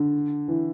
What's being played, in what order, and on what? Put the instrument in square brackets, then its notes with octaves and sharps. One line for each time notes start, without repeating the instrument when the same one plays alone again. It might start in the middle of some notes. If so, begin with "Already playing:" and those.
Already playing: [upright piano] D3
E3